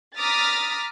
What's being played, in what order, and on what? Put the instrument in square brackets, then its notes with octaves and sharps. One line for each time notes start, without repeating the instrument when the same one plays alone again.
[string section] A#5 D6 D#6 F6 A6 B6